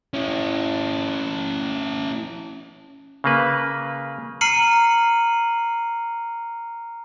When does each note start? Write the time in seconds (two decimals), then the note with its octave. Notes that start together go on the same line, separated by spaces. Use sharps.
0.14 C#4 E4
3.24 C#3 A#3 B4
4.41 A#5 F6 C7 C#7 D#7 F#7